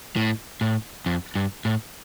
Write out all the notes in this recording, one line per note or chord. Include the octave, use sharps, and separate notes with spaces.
A2
A2
F2
G2
A2